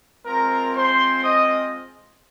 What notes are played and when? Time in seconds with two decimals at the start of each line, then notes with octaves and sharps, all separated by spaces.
0.25 G#3 C4 F4 A#4 A#5
0.75 C5 C6
1.23 D#5 D#6